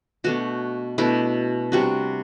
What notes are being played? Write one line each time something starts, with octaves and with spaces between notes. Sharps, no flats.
B2 A3 D4 F#4
B2 A3 D4 E4
C3 G3 D4 F#4